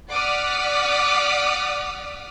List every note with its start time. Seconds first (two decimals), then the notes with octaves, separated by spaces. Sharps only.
0.11 D5 F#5 D6 D#6 F6 B6